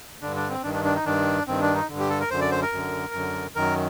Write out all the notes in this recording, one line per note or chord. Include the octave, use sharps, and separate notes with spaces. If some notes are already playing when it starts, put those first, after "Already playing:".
G2 D3 D4
D4
C4
G2 D#3 D4
D4
D4
D#4
G2 D#3 D4
G2 D#3 C4
D4
D#4
G2 D3
G4
A4
A#4
F#2 D3 C5
D5
C5
A#4
F#2 D3
F#2 D3
F#2 D#3 A#4